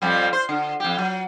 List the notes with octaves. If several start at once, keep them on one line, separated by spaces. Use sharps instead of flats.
F2 F3 G3
C5
D3
F2 G4
F#3